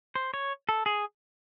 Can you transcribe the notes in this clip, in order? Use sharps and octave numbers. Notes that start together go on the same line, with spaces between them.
C5
C#5
A4
G#4